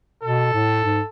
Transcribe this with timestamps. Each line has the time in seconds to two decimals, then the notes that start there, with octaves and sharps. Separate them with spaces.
0.24 B2 A4
0.54 A2
0.84 G#2